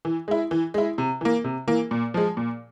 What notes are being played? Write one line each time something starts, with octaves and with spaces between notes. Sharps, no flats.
E3
G#3 E4
E3
G#3 E4
C3
E3 A#3
C3
E3 A#3
A#2
F3 G#3
A#2